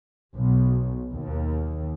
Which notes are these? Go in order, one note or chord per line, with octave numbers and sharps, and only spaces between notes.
B1
D#2